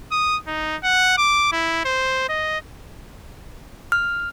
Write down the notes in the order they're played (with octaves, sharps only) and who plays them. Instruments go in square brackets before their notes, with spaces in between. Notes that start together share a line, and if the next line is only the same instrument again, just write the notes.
[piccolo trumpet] D#6
D#4
F#5
D6
E4
C5
D#5
[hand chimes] F6